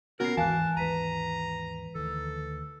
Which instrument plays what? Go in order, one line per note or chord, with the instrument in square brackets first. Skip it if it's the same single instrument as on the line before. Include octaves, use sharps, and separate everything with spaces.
[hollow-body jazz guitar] B3 C#4 F#4 [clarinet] A#4 [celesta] F#5 C7
[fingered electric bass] D#2 G#2 [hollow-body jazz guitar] E3 F5 [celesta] G#5 F#6 [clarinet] A5
[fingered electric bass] D#2 G#2 [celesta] B4 B6 D#7 [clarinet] A#5
[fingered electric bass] D2 D#3 [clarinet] A4